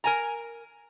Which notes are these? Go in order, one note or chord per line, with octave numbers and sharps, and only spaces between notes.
A#4 G#5 A#5